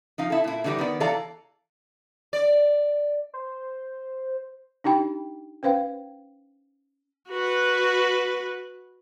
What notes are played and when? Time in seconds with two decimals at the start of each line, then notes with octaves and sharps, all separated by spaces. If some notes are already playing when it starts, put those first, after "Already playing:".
0.18 F3 D#4 F5
0.30 E4 A4
0.44 A#2 E4
0.64 D3 E3 G3 D#4 G4
0.78 D#3 B3 D5
1.00 E3 A4 D5 F5 A#5
2.33 D5
3.34 C5
4.84 D4 D#4 G4 G5 B5
5.63 C#4 B4 C5 F5 G5
7.29 F#4 B4